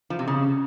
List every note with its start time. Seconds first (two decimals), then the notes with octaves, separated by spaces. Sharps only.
0.10 F3
0.19 C3
0.28 C#3